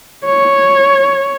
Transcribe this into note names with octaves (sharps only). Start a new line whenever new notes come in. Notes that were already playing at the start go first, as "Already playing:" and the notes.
C#5